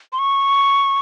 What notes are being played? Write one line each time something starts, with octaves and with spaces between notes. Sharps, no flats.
C6
C#6